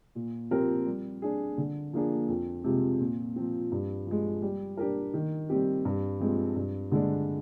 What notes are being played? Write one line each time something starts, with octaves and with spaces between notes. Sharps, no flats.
A#2
F3 C4 G4 A#4
G3
D4 G#4
D3
F3 A#3 D4 G#4
F2
C3 F3 G#3
A#2
F3 C4
G2
F3 G#3
G3
D4 G4 A#4
D#3
G3 C4 G4
G2
F3 G#3 C4
G2
D3 G#3 D4